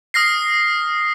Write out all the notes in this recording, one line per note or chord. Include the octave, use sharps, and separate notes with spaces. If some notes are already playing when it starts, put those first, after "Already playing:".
D#6 F6 A#6 C7